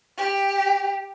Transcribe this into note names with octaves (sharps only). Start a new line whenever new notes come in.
G4